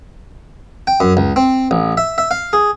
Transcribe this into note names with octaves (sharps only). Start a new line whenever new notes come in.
G5
F#2
C#2
C4
A1
E5
E5
F5
G#4